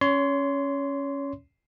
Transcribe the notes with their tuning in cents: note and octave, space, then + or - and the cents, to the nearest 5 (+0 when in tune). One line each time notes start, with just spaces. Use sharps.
C#4 +0 C#5 +25 C6 -10